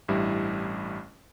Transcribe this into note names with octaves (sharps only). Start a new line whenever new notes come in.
A1 G2 G3 E4